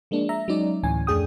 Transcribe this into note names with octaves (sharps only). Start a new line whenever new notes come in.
F3 G#3 A#3 D4
E5 A#5
F#3 G#3 C#4 D#4 D5
D2 A2 E3 C#4 G#5
F2 A3 D4 G#4 G5 D#6